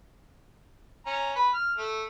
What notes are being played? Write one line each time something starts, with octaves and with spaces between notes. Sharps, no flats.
C#4 A#5
B4
F6
A3